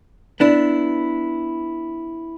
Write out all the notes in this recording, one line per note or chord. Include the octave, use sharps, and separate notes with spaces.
B3 D4 E4